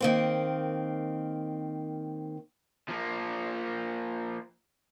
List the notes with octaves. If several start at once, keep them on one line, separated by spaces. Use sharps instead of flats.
D#3 A#3 C4
F3 A#3